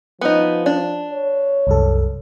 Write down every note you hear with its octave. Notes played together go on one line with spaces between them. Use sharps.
F3 B3 D#4
D4
C#5
C2 F#2 A4